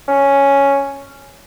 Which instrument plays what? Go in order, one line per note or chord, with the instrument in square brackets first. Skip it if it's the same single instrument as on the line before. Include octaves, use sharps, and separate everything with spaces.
[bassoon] C#4